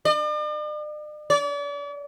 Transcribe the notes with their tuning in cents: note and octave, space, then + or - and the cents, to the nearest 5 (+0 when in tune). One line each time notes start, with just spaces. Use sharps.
D5 +45
D5 -40